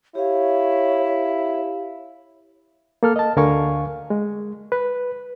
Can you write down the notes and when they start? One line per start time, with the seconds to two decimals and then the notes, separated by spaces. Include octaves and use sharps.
0.15 E4 G4 C#5 F5
3.03 A#3 A4 F6
3.16 D#5 A5
3.36 D2 D3 A#4 F5 G#5 C#6
4.10 G#3
4.72 B4